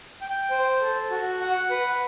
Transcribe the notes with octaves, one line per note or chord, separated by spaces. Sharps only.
G5
C5
A4
F#4
F#5
B4